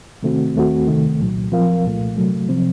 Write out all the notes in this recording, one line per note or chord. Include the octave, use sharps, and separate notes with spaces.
C3 D#3 A3 C4 F#4
D#2 D#3 A3 C4 F#4
C2 C3 D#3 A3
C2 A#2 F#3
F3 C4 F4 A#4 F5
C2 A#2 A3
C3 F#3 A3
C3 F3 C4